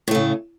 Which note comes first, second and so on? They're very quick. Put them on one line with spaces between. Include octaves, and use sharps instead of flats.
A2 A3 C#3